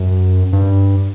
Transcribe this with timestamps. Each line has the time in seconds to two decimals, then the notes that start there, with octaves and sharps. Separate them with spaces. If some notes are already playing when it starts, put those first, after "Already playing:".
Already playing: F#2
0.52 G2